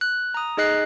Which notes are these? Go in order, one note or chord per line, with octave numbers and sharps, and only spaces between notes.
F#6
A#5 D#6
D#4 G#4 D#5 F#6 C7